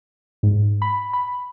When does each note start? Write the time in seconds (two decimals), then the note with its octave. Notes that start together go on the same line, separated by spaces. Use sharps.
0.43 G#2
0.82 B5
1.13 B5